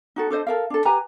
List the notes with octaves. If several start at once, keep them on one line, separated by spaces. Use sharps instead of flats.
D#4 F#4 A4
D4 A4 C5 D#5
A4 A#4 F5
D4 A4
G4 B4 G#5 A#5